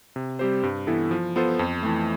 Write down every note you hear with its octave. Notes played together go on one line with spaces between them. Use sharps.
C3
G3 C4 G4 C5
G2
E3 B3 E4 A4
F3
B3 F4 A4 C5
F2
E3 A3